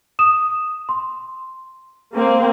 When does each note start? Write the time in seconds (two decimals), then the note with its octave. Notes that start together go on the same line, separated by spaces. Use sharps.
0.19 D#6 E7
0.89 C6
2.15 A#3 C4